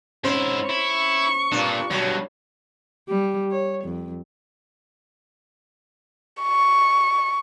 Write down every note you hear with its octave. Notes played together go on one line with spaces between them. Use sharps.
G#2 C#4 E4 C5
E4 C#6
G2 A#2 D4
G2 B2 F#3
G3
C#5
F2
C#6